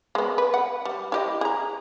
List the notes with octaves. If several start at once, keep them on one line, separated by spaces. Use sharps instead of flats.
G#3 B3
B4
F#5
G3
E4 G4 D#5
G#4 A#5